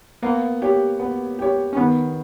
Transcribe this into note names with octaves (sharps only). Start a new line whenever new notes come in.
A#3 B3
G4 C#5
B3
G4 C#5
C#4
D#3 B3